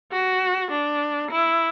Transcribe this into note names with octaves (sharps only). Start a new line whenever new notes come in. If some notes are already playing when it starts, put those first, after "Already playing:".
F#4
D4
E4